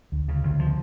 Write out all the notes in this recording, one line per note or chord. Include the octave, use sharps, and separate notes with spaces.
D2
C#3
D2
F3